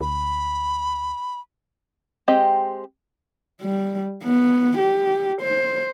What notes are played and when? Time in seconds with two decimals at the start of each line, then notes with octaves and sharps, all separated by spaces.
0.01 D2 B5
2.28 G#3 C4 G4 D#5
3.61 G3
4.23 B3
4.78 G4
5.42 C5